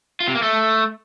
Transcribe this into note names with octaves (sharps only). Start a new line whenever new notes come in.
F4
C3
A#3
A3